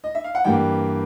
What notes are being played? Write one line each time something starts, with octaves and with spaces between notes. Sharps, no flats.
D#5
E5
F5
F#5
G2 E3 G3 A#3 G5